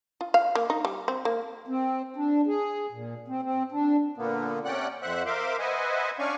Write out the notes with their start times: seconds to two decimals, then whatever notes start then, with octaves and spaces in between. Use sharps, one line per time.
0.21 F4
0.34 F5
0.55 A#3
0.70 D#4
0.85 G3
1.08 C4
1.25 A#3
1.68 C4
2.16 D4
2.47 G#4
2.92 A#2
3.28 C4
3.42 C4
3.72 D4
4.17 A#2 D3 A#3 B3
4.65 C3 C#4 D5 F#5 G5 F#6
5.02 F2 C5 E5 F#5 F#6
5.26 A#4 C5 E5 F5 C6 D6
5.59 B4 C5 D#5 E5 F#5 G#5
6.19 C#4 D4 D5 F5 G#5 C#6